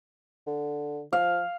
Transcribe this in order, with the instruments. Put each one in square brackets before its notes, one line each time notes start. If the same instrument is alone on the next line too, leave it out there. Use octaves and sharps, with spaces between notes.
[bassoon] D3
[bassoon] F3 [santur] F5